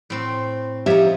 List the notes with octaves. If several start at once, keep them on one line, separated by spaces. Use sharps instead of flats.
A2 C4
F3 D#4 G4 C#5 E5